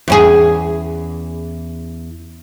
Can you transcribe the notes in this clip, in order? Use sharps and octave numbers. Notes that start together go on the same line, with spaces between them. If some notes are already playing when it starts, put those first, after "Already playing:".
E2 C#4 G#4